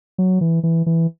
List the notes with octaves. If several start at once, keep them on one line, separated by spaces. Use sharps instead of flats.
F#3
E3
E3
E3